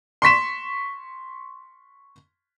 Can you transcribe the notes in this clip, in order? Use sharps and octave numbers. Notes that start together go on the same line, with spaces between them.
C6 C#6 B6 E7